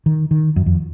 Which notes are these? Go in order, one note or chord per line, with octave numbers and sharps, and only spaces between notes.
D#3
D#3
F#2
F2